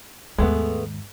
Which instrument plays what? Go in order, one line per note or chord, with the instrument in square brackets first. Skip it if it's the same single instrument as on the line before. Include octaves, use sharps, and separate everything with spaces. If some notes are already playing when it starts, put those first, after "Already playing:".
[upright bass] D#2 G#2 [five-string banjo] G#3 A3 B3